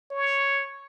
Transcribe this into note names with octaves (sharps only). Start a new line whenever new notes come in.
C#5